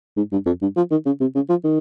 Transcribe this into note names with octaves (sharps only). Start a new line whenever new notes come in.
G#2
G2
F2
G2
F3
D#3
C#3
C3
C#3
F3
D#3